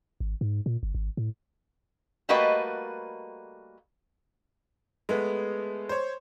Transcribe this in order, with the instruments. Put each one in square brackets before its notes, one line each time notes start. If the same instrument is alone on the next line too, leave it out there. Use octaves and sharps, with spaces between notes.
[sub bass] G#1
G#2
A#2
G1
G#1
A2
[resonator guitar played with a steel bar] G3 A3 A#3 F#4 B4 D#5
[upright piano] G#3 A3 B3
C5 C#5